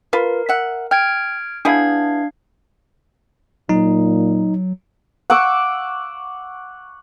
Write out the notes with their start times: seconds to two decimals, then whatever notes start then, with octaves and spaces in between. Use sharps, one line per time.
0.13 F4 A#4 B4
0.49 E5 F#5
0.91 G5 F6 G#6 D7
1.65 B3 D4 E4 G#4 F5 G#6
3.69 A#2 F#3 D#4
5.30 F#5 C#6 D6 E6